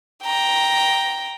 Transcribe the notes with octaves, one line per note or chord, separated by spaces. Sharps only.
G5 A#5